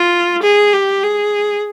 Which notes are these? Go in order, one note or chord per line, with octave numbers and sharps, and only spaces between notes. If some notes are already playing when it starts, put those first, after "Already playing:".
Already playing: F4
G#4
G4
G#4